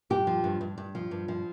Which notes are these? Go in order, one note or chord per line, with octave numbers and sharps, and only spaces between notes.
G2 G4
F3
G2
G2
G2
F3
G2
F3